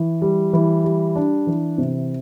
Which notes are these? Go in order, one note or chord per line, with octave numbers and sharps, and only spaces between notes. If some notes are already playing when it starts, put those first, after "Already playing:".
Already playing: E3
G3
E3
G3
D4
E3
C3